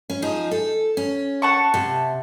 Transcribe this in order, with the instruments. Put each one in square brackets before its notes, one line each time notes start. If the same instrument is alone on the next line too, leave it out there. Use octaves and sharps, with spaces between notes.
[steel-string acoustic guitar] C#4
F3 D#4 G#4
A4
C#4
[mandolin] F#5 A5 C#6
[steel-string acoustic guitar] C3